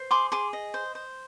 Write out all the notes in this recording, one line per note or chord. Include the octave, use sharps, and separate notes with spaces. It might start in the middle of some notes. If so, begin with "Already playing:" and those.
Already playing: C5
G#4 C6 D6
G#4 C6 D6
D#5
C5
C5